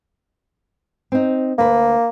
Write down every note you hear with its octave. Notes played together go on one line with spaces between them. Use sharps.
C4 D#4
D2 A#3 B4